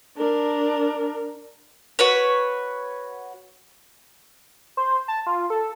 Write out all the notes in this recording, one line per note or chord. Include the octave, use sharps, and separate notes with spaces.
D4 A#4
F#4 B4 C#5
C5
A5
F4
A4